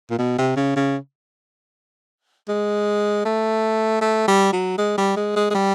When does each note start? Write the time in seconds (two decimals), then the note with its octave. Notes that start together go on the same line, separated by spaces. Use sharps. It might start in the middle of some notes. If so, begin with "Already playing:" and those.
0.10 A#2
0.18 B2
0.38 C3
0.56 C#3
0.76 C#3
2.49 G#3
3.25 A3
4.01 A3
4.28 G3
4.53 F#3
4.78 G#3
4.98 G3
5.16 G#3
5.36 G#3
5.50 G#3
5.54 G3